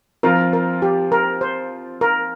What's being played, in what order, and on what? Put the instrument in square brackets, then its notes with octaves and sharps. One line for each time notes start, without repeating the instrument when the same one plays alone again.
[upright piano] F3 C4 F4 [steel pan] A#4
[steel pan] A#4
G4
A#4
C5
A#4